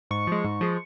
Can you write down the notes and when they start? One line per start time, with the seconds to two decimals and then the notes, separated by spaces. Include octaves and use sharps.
0.11 G#2 C#6
0.27 F3 G#3
0.44 G#2
0.61 F3 G#3